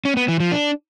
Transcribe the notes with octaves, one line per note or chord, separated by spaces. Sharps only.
C#4
B3
E3
F3
D4